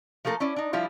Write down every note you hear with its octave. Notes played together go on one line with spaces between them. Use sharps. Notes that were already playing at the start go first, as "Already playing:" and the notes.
F3 A3 A#3 A4 A#4
C#4 E4 D5
D4 D#4
F3 G3 E4 F4